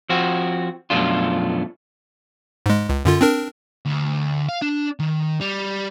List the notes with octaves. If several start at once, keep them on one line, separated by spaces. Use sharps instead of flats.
F3 C4 F#4
F#2 B2 F3 A3 D4 F4
G#2 G#3
C#2
F#2 D3 F4
C4 D4 A#4
D2
F5
D4
D#3
G3